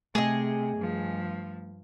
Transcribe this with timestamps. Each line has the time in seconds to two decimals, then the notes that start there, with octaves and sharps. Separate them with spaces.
0.15 C3 A3 G#4 D#5
0.77 G2 F3